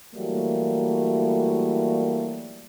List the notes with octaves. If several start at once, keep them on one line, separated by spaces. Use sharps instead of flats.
E3 F#3 G3 A3 A#3